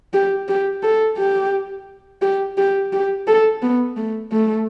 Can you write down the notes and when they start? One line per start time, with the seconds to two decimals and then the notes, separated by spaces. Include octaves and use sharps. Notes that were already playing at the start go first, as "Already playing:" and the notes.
0.13 G4
0.48 G4
0.83 A4
1.17 G4
2.22 G4
2.58 G4
2.93 G4
3.27 A4
3.62 B3
3.96 A3
4.31 A3